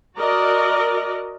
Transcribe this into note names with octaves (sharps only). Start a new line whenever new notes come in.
F#4 A#4 D5 D#5